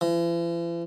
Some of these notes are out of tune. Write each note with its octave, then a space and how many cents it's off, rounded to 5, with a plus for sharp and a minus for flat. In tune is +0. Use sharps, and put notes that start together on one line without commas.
E3 +45